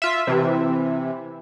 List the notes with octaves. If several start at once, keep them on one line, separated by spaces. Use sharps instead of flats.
F4 E5
C3 E3